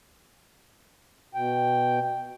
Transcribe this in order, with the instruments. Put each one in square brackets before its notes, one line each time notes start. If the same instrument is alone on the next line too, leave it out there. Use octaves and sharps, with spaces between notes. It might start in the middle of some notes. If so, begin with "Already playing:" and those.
[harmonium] B2 G5